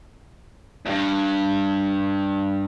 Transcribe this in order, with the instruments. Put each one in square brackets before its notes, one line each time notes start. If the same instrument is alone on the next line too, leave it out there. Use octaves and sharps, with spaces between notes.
[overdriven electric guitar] E2 G2